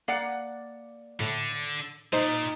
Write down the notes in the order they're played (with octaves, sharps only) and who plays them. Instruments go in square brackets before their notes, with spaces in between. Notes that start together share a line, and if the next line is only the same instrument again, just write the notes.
[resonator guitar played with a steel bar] A#3 D5 F#5 [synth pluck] C7
[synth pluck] A2 [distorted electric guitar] D3
[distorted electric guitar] A#2 [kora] D#4 [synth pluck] C5